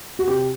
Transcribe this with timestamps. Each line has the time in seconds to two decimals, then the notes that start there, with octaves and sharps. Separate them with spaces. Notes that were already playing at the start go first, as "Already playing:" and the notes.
0.19 F#4
0.28 C3 G4